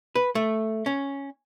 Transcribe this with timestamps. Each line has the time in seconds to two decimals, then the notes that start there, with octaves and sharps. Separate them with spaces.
0.15 B4
0.35 A3
0.86 C#4